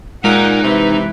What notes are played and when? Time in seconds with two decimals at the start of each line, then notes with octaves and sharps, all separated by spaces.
0.24 A#2 G#3 D#4 F#5 G#5 A#5 F#6 D7
0.63 C3 E3 E4 B4